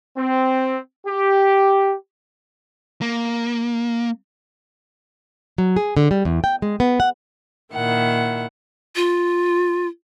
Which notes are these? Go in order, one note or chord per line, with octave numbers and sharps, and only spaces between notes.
C4
G4
A#3
F#3
G#4
D3
G3
E2
G5
G#3
B3
F#5
A#2 D#3 E4 F#5
F4